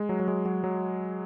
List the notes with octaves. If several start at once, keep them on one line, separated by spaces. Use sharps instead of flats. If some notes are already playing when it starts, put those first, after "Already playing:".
Already playing: G#3
F#3
F#3
G#3
F#3
F#3